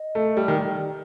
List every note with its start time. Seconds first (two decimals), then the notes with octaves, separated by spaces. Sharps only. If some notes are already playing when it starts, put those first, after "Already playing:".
Already playing: D#5
0.15 A3
0.36 G3 D5
0.48 D#3